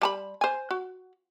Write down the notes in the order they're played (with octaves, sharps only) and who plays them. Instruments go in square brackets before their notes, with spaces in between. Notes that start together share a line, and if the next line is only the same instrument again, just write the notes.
[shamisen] G3 A5 B5
C5 G#5
F#4